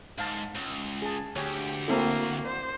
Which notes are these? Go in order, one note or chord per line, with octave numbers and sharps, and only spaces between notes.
G#2 F5 A5
C#2
G#4 A5
D2 G4 C#5 G#5
A#3 C4 E4 F#4 A4
C5 D5